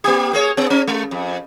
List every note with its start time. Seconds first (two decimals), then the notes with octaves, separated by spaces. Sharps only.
0.04 A#3 G4
0.33 A#3 G#4 C#5
0.57 B3
0.70 C4
0.87 G#3
1.11 F2